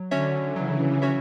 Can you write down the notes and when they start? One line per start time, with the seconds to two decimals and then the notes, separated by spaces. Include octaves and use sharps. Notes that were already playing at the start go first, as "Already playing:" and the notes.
Already playing: F#3
0.11 D3 C#4 F#4 C#5 E5
0.56 C#3 E3 F#3
1.02 C#4 F#4 C#5 E5